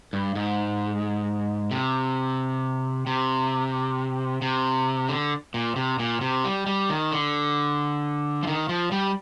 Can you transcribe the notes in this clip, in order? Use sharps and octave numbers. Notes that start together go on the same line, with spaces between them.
G2
G#2
C3
C3
C3
D3
A#2
C3
A#2
C3
G3
G3
D#3
D3
F3
D#3
F3
G3